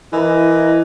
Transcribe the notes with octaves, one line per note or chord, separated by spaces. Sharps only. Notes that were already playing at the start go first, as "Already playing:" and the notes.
E3 E4 A#4 D#5